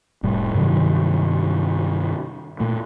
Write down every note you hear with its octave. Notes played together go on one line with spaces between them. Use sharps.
F1 A2 G3
G2 C3 D#3 F#3
A#2 A3